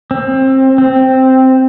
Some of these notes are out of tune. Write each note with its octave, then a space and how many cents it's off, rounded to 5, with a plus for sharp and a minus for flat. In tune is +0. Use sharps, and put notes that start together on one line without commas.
C4 +25
C4 +0